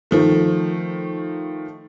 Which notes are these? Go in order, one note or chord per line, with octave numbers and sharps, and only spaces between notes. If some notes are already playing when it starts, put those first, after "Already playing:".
D#3 F3 A3